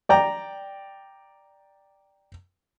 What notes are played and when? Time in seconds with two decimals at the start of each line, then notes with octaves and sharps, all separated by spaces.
0.09 D5 G5 A#5